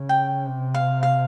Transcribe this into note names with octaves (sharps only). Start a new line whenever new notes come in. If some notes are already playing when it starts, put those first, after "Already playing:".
Already playing: C#3
G5
C3
F5
F5